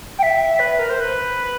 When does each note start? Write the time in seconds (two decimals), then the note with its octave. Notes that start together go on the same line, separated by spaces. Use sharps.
0.19 G5
0.23 E5
0.59 B4
0.79 A#4
0.89 C5
1.00 B4